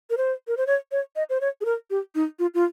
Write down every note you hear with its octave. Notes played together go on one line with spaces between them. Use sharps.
A#4
C5
A#4
C5
C#5
C#5
D#5
C5
C#5
G#4
A#4
G4
D#4
F4
F4